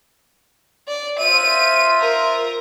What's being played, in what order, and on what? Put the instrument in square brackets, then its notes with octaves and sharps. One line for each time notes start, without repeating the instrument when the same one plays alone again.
[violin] D5
[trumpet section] F4 C5 E5 [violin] D#7
[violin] A#4